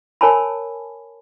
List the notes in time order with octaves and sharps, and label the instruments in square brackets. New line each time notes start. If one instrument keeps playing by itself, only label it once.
[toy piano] A#4 C#5 G#5 A5 B5